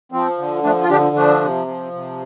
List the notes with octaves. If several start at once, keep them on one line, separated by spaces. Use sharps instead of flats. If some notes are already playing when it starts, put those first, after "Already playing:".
F3 C4
D3
F3 A3 D4
F4
D3 D4 G4
F3 A3 D4
C3
F3
C3